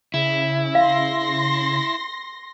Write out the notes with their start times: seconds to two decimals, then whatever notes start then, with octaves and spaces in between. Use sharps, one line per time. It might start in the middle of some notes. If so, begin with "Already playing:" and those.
0.14 C#3 E4
0.75 F5 C6 A#6